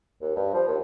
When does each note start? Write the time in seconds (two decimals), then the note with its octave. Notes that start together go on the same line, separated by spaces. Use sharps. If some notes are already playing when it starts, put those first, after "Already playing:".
0.21 D#2
0.36 G2
0.54 F3
0.68 D#2